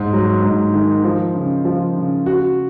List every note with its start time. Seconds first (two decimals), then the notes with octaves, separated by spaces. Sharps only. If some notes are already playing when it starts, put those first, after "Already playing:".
Already playing: G#2
0.13 F#3
0.43 G#2
0.74 D#3
1.04 F3
1.35 C#3
1.65 F3
1.96 C#3
2.26 F#4